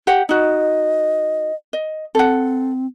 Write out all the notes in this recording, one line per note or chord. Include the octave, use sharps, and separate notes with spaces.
G4 F#5
D#4 F#4 D#5
D#5
C4 A4 F#5